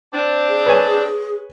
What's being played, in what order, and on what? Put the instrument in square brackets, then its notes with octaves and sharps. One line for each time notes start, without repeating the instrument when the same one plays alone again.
[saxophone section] C4 D4
[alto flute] G#4
[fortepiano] B4 C#5 G#5